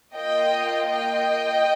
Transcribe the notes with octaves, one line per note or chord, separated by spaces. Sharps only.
A#3 F4 D#5 G5
D#5 G5